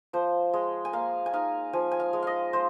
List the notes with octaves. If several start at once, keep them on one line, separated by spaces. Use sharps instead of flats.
F3 C5
G#3
G#5
A#3 F5
G#5
D#4 F5
F3 G#5
G#5
F5
G#3
D#5 F5
G#3 C5